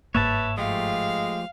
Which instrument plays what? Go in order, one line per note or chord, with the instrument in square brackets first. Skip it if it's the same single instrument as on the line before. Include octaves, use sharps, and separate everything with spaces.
[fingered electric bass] G1 G#2 A#3 [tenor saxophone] B4 [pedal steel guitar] C#5 E5 A5
[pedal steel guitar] F3 A3 G4 [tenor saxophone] G#3 [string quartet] F5